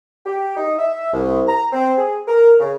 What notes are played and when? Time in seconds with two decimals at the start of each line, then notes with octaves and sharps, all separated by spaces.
0.25 G4
0.56 D#4
0.78 E5
1.13 C2
1.47 A#5
1.72 C4
1.97 G#4
2.27 A#4
2.59 C#3